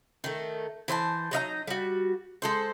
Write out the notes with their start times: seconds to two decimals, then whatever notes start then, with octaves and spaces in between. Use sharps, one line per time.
0.24 D#3 A3
0.88 E3 C5 E5 A5
1.31 F#3 D#4 E5 A#5
1.67 G3 F#4
2.42 G#3 A4 C5